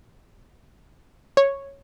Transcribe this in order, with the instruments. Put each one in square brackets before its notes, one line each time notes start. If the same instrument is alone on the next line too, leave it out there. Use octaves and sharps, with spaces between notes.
[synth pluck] C#5